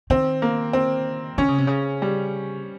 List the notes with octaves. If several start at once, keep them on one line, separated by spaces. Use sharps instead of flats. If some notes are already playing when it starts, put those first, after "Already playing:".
D#3 C4
A#3
C4
D#3 C#4
C#3
C3
C#3
G3